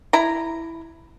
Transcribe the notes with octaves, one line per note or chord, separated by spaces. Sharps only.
E4 A#5